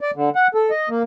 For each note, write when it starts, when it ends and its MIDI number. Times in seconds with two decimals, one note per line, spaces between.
0.01 0.11 74
0.16 0.29 50
0.35 0.47 78
0.55 0.70 69
0.70 0.89 75
0.89 1.03 58